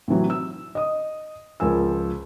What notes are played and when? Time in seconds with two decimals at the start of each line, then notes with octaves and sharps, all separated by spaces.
0.08 A2 C3 E3 F#3
0.30 E6
0.75 D#5 D#6
1.60 C#2 F3 A#4 G#5 E6